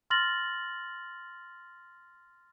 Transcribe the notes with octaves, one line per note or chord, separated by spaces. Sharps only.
C6 F6 A6 A#6 F#7